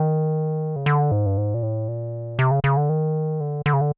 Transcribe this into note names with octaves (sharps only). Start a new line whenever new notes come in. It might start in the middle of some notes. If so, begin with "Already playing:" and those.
Already playing: D#3
C#3
D3
G#2
G2
G#2
A#2
A2
A#2
C3
C#3
C#3
D3
D#3
D3
D3
C#3
D3